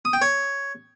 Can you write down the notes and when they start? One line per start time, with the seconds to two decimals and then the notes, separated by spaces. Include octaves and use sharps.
0.05 D#6
0.13 G5
0.22 C#5